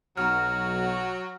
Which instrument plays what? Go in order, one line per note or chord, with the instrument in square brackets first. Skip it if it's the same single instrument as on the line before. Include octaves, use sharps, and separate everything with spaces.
[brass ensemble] B1 [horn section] F#3 F#4 [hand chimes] A#5 F6